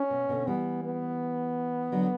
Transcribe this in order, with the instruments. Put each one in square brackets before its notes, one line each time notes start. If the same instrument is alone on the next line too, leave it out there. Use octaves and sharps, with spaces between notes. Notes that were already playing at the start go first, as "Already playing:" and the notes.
Already playing: [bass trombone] C#4
[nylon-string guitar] B2
B2 D3
[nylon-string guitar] E3 G3 [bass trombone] B3
[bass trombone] B3
[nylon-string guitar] D3 F#3